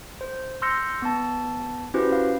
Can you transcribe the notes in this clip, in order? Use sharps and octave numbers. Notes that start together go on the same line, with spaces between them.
C5
C6 E6 F6 G6 A#6 C#7
B3 A5
C#4 E4 F#4 G4 B4 C5
F5